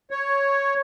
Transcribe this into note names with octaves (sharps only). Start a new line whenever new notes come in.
C#5